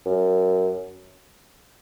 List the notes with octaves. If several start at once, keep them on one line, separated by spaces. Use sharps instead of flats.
F#2